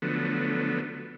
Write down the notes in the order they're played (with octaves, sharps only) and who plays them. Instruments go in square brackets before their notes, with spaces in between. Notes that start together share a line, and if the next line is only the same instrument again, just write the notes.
[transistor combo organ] D3 F3 F#3 A3 B3